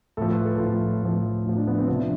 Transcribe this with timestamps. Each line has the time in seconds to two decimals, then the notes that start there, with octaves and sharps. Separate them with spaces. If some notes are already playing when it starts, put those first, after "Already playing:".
0.17 A2 F3 A4
0.32 B4
0.45 A4
0.59 A2 F3 F4
1.02 A2 F3
1.45 A2 F3 E4
1.57 D4
1.67 B3
1.78 C4
1.88 C3 F3 D4